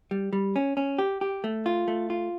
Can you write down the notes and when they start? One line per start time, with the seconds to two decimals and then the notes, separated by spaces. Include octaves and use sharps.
0.11 G3
0.33 G3
0.56 C#4
0.77 C#4
0.98 G4
1.21 G4
1.44 A3
1.66 F4
1.88 A3
2.10 F4